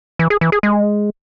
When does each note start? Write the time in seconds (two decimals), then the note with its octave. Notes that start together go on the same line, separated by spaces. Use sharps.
0.19 E3
0.30 G#4
0.41 E3
0.52 G#4
0.63 G#3